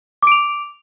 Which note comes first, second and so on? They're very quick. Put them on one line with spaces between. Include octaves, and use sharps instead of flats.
D6 D7 F7